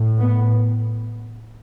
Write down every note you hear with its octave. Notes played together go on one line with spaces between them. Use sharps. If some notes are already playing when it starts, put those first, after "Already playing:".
Already playing: A2
B3